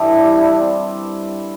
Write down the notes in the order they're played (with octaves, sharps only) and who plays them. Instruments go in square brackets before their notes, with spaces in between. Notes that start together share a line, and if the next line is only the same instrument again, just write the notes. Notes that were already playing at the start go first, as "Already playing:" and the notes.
Already playing: [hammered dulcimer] G2 E3 G3 A4
D4
E4
D4
C4